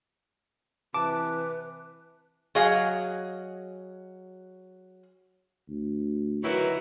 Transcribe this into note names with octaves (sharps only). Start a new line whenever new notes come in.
C3 E3 B4 A5 D6
F#3 G#4 D#5 F5
D2
D#3 E3 F#3 E4 F#4 E5